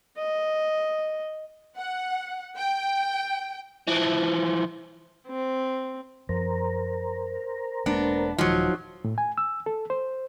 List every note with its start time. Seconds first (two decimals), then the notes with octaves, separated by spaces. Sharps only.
0.18 D#5
1.77 F#5
2.57 G5
3.87 E3 F3
5.28 C4
6.29 F#2 F3 C4 A#4 C5 A#5
7.86 E1 G#3 A#3 B3 D4
8.38 D#1 D#3 F3 F#3 G#3 D#4 F#4
9.04 A2
9.18 G#5
9.38 E6
9.66 A4
9.90 C5